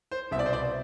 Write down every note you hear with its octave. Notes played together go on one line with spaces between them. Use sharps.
C5
C2 B2 E5
D5
C5
D5